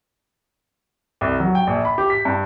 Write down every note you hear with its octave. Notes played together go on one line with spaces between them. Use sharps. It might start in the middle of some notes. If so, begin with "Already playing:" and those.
C2
F#3
G5
A#1
B5
G4
B6
G2